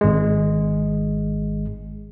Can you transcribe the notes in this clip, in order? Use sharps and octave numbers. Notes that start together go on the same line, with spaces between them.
G#1 G#3